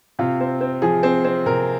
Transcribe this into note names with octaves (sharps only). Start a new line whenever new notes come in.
C3 F4
C4
C4
F3 G#4
C4
C4
C3 A#4